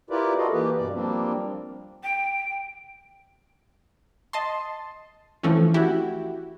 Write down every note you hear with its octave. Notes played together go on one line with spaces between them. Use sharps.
E4 F4 G4 A#4 B4 D5
F4 F#4 A4 D#5 F5
E3 A#3 G4 B4
G2 B2 D5
F3 G3 A#3 C4 D4
G5
D#5 A5 C6
E3 F3 A3 C4 C#4
E4 F#4 G4